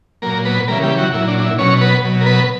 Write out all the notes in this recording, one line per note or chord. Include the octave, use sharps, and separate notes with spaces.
A#2 F#3 A#3 A#4
B3 B4
C#3 E3 G3 A#3 A#4
G3 G4
F#3 F#4
A#2 F#3 E4
D4
D4
E4
B2 F#3 C#4 C#5
B3 B4
B2 F#3
A#4
B3 B4